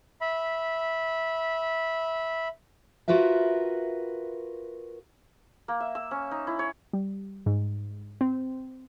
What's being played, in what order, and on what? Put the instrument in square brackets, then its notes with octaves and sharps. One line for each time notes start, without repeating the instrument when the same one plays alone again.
[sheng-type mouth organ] E5 B5
[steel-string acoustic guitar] F4 F#4 A#4 B4 E5
[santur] A#3
E5
E6
C#4
D#4
E4
C#5
[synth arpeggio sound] G3
G#2
C4